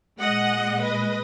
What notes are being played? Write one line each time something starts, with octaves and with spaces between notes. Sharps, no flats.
A#2 G#3 D#5 F#5
B4 D#5